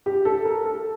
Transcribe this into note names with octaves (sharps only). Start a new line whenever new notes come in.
G4
A4
A#4
A4